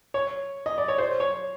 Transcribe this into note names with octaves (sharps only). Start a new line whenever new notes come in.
C#5
D#5
D5
C#5
C5
C#5